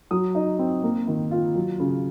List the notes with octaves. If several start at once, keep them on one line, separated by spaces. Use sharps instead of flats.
F#3 D#6
D#4
C4
A#3
D#3
F4
F#3
C#3